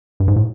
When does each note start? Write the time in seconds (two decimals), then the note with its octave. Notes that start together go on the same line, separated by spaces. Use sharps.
0.20 G2
0.28 G#2
0.36 A2